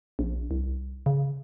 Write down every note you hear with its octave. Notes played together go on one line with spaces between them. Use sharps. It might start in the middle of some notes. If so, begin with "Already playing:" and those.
A#1
C2
C#3